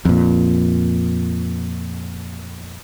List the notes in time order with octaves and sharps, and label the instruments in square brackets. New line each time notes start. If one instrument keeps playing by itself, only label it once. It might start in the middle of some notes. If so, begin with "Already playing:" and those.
[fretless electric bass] F2 A#2